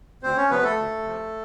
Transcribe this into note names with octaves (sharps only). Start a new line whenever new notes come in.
D2 C4 C5
C#4 C#5
C3 F3 B3 B4
A3 A4
D2
C3 F3